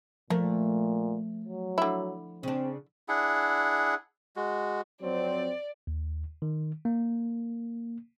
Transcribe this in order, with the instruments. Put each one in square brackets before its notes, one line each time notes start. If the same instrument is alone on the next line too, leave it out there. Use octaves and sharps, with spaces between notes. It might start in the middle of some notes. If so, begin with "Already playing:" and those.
[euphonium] A#2 [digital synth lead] F3 [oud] A3 [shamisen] A#3
[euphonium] F#3
[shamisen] D3 E4
[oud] C#3 D4 [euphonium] C4
[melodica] D4 E4 G#4 F#5
G#3 F#4
[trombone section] F2 F#3 C4 [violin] D5
[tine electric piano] D#2
D#3
A#3